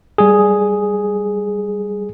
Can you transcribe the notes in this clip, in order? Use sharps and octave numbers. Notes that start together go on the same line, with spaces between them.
G3 G#4